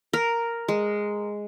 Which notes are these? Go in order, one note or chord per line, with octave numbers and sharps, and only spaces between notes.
A#4
G#3